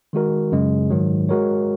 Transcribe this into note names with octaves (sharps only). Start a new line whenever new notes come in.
D#3 G#3 F#4 A#4
F#2 C#3 G#3
G#2 D#3 F#3
G#3 F#4 A#4 C#5